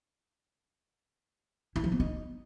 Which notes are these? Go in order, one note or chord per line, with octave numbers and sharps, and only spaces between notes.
E4
F3
B3
D#4